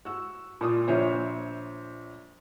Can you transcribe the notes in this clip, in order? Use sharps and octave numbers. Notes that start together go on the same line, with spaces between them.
F#4 E6
A#2 F4 D#6
A#1 F4 C5 C#5 E5